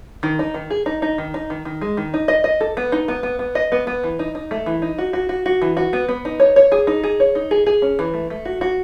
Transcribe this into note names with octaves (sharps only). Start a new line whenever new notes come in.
D#3
D#4
D#3
G#4
D#4
D#4
D#3
D#4
D#3
D#3
G#3
D#3
D#4
D#5
D#5
A4
B3
D#4
B3
B3
B3
D#5
B3
B3
E3
D#4
D#4
A3
E3
D#4
F#4
F#4
F#4
F#4
E3
F#4
B3
B3
D#4
C#5
C#5
G#4
D#4
G#4
C#5
D#4
G#4
G#4
C#4
E3
A3
A3
F#4
F#4